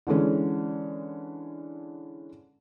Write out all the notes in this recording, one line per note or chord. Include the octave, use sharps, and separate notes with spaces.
D3 E3 G#3 C#4